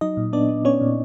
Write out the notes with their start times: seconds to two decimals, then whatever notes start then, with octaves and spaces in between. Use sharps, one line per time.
0.01 F#3 D#4 D#5
0.17 A#2
0.33 B3 D4 D5
0.49 B3
0.65 B3 C#4 C#5
0.81 A#2